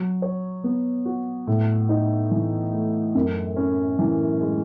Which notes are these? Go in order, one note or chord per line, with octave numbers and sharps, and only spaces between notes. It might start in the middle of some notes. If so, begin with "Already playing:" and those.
Already playing: F#3
C#5
B3
F#4
A2
D#4
E3
A3
F#2
C#4
E3
G#3